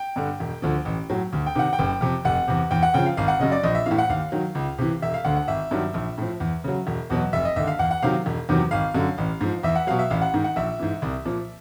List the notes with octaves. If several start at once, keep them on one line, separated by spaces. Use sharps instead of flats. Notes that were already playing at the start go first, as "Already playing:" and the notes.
Already playing: G5
G2 D3
E1
D2 D3 F3
A1
A2 F#3
D2
G5
C3 D#3 F#5
G5
F#1
F2 C3
F1 F#5
E2 C3
E2 G5
F#5
C#3 F3 G5
F5
G#1 F5
F#5
F#2 C#3 D#5
D5
A#1 D#5
E5
A2 E3 F5
F#5
D#2 F5
D#3 F#3
C#2
C3 E3
E1 E5
F5
D2 D3 F#5
F#5
G#1 E5
G2 D#3 F#3
A#1
A2 F3
E2
C#3 F#3
E1
E2 B2 F#3
F1 E5
D#5
D#2 D3 E5
F5
E2 F#5
F#5
C3 D#3 F#3 F5
E1
E2 C3 D#3 F#3
G#1 F5
F#2 D3
A1
G#2 F3
E2 E5
F#5
B2 F#3 F5
E5
A1 F5
F#5
G#2 D#3
F#5
A#1 E5
G#2 E3
C2
A#2 F3